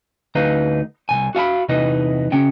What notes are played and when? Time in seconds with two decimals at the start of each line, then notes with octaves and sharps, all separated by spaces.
0.35 D2 D#4 B4 F5 A#5
1.09 C2 A#2 G#5
1.35 F#4 F5 G#5 B5
1.69 E2 C3 E3 D#4 B4 D#5
2.32 C#3 C#4 G5